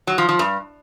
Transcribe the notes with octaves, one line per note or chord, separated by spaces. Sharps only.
F#3
F3
F3
G2